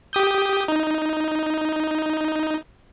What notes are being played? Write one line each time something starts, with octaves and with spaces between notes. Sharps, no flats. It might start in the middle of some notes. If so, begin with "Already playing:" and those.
G4 D#6 G6
D#4